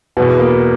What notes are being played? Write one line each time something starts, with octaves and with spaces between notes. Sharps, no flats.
E2 B2 B3
A#3